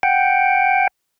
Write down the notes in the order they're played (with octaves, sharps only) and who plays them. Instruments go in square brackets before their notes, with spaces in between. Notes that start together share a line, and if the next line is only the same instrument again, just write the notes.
[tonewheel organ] F#5 G5